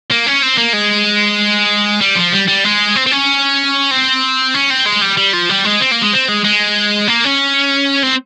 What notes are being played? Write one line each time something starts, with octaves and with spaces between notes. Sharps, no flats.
A#3
C#4
C4
A#3
G#3
G3
F3
G3
G3
G#3
C4
C4
C#4
C4
C#4
C4
G#3
G3
G3
F3
G3
G#3
C4
A#3
G#3
C4
G#3
G#3
A#3
C#4
C4